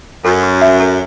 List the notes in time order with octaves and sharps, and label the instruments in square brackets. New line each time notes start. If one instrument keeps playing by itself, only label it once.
[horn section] F#2 [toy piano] A4
[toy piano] C#6
E5
A4